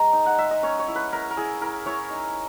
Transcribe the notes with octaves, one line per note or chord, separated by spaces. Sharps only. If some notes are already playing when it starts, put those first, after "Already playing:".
Already playing: G#3 D#5 A#5
D#4
F#5
G#3 E5
D#5
C#4 C#5
C#5
E4
B4
E4 A#4
A#4
E4 G#4
E4 A#4
E4 C#5
D#4